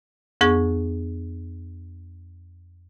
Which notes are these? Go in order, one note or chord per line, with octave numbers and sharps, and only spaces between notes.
F2 B3 G#4 C#6